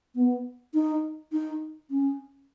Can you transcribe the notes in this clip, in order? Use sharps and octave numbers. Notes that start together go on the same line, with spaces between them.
B3
D#4
D#4
C#4